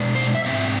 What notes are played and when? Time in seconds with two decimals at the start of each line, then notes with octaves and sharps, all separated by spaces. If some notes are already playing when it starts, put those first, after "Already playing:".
Already playing: B2 G#3 D4
0.15 C5
0.35 E5
0.45 G#2 G#3 C4 E5